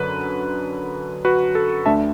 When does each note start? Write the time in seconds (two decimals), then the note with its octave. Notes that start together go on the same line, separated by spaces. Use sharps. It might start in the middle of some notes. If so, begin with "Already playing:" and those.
Already playing: F#2 D3 F#3 B4
1.25 F#4 B4
1.55 A4
1.86 D2 D3 A3 D4 E5 A5